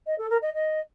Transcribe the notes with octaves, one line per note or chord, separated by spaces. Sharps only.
D#5
A4
A#4
D#5
D#5